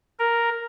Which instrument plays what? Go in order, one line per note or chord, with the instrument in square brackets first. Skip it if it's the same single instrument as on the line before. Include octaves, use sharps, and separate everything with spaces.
[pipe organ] A#4